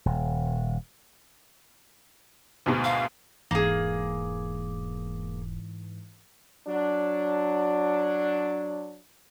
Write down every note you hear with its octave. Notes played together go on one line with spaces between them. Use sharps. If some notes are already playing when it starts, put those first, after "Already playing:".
D#1
D2 G#2 B2
F5
E1 G#2 E3 A#3 G#4
F#3 D4